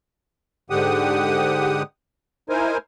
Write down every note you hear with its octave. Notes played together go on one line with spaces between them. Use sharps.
G#2 D3 G4 F#5 D#6
D#4 E4 A#4 C5 G#5